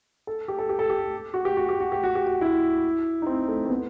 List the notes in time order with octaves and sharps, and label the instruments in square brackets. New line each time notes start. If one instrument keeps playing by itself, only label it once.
[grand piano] A4
G4
A4
G4
A4
G4
F#4
G4
F#4
G4
F#4
G4
F#4
G4
F#4
E4
D#4
C4
A3
C4
B3